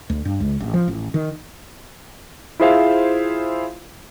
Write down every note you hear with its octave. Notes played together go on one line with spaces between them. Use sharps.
D2
G2
C#2
A1
F3
A1
D#3
E4 F4 G#4 C5 E5 F5